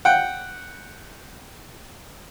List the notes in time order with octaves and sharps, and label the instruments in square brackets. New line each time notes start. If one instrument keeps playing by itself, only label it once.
[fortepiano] F#5 G5